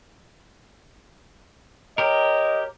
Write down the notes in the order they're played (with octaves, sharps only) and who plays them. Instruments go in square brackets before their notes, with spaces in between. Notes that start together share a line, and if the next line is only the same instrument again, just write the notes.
[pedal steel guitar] G4 A#4 [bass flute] C#5 [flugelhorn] D#5